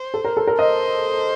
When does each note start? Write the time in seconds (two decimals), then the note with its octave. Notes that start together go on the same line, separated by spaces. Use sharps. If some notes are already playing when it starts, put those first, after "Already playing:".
Already playing: C5
0.14 A4
0.25 A#4
0.37 A4
0.47 A#4
0.59 C5 D#5